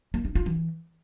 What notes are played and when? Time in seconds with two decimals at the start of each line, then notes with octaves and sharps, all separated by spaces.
0.14 A#3
0.25 D#4
0.35 F4
0.46 E3